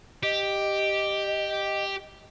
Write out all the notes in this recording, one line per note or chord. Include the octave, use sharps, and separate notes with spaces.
G4 D#5